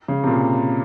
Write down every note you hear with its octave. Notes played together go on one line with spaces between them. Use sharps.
C#3
C3
A#2